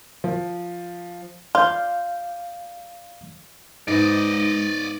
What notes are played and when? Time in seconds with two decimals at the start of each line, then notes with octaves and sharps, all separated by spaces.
0.24 F3
1.55 F4 D5 F5 G6
3.88 G#2 G#3 B3 D#4 D5 D#5